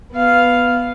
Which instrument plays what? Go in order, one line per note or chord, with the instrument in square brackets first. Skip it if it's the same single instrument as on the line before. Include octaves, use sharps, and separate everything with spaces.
[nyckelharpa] B3 F5